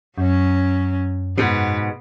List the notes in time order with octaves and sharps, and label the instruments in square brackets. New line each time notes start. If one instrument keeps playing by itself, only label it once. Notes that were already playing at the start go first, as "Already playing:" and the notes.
[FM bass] F#2 [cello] F#3 C#4
[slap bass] G#2 B2 [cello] B3